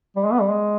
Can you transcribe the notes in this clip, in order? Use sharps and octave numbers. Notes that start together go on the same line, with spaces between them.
G3
G#3
B3
G3
G#3